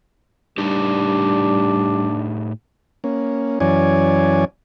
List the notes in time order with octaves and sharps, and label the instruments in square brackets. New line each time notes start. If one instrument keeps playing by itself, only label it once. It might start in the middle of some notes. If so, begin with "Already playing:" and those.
[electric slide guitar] A2 D#4 G4 [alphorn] G3 [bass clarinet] D4
[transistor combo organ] A#3 C#4
F#2 E3 C#4 C#5 D5 G#5